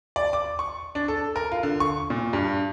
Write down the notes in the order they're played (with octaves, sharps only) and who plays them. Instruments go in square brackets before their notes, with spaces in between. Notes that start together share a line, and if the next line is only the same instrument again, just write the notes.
[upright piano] D5
D6
C#6
D4
A4
A#4
F4
D3
C#6
A#2
G2